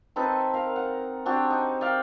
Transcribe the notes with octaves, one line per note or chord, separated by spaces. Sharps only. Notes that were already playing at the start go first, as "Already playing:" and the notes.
C4 D#4 A4 B4
A#4 F5
F#5
C4 D4 F#4 G4
D#4
D5 E5 F5 G5